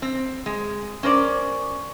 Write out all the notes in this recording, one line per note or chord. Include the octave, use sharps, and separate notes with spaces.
C4
G#3
C#4 A#4 C5 D5